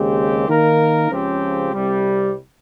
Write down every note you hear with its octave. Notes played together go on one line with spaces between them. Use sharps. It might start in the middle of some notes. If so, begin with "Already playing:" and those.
Already playing: D#2 C#3 G#3 C4 G4
D#3 A#3 D#4 A#4
C#2 C#3 F3 C4 G4
C2 C3 G3